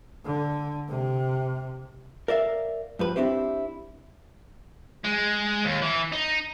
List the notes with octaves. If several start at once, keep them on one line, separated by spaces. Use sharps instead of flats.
D3
C3
A#4 D5 E5 F5
G2 F3 B4
C4 D4 E4 G4 C5
G#3
D#2
E3
D#4